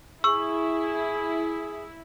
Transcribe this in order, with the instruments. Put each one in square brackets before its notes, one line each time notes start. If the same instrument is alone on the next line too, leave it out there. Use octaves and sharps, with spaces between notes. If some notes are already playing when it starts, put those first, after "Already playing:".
[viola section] E4 [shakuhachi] G#4 [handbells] C#6 [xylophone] E6